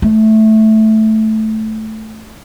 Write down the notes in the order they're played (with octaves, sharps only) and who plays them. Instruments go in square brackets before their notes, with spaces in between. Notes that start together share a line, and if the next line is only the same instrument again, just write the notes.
[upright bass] A3